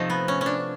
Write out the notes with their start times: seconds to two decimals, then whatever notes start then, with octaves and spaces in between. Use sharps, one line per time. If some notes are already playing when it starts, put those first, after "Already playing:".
Already playing: C3 F3 A3 D#4
0.10 B3
0.28 C#4
0.41 C#4
0.46 D4